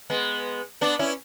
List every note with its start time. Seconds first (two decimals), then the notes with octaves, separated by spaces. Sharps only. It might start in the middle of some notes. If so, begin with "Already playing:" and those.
0.10 G#3 B3
0.81 B3 D4
0.99 C#4 E4